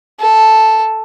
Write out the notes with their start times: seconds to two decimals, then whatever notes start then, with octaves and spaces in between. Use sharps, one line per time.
0.20 A4